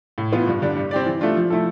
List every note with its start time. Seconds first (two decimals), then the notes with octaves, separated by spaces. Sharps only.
0.18 A2
0.32 E3 B3 F4
0.47 G2
0.62 D3 G3 D4
0.77 G3
0.91 C4 G4 D5
1.06 E3
1.21 A3 D4 F4
1.36 F3
1.50 A3 E4 A4